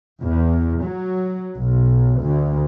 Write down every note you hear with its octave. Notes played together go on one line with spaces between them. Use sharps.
E2
F#3
B1
D2